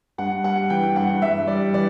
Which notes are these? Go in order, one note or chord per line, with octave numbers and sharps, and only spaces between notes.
G2 F#5
G3 F#5
E3 G5
G2 F#5
G2 E5
G3 D5
E3 D5